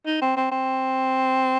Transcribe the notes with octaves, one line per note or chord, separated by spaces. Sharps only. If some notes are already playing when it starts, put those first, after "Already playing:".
D#4
C4
C4
C4